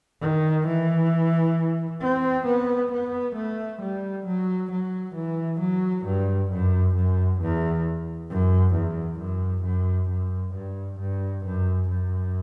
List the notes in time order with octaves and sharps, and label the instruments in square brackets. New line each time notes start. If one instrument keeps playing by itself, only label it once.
[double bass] D#3
E3
C4
B3
B3
A3
G3
F#3
F#3
E3
F#3
G2
F#2
F#2
E2
F#2
E2
F#2
F#2
F#2
G2
G2
F#2
F#2